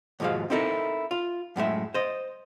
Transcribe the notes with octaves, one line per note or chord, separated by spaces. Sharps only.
D#2 G#2 B2 F3 G#3 F5
C4 D#4 E4 A4 A#4
F4
F#2 A2 G#3 E5
C5 D#5